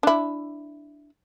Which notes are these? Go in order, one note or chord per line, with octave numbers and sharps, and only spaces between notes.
D4 E4